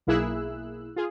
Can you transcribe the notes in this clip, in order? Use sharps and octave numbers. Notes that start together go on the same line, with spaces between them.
B1 A#3 E4 G#4 E6 F#6
F4 G#4